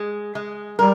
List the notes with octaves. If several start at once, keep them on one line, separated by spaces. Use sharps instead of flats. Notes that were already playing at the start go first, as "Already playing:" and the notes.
Already playing: G#3
G#3
G3 A#4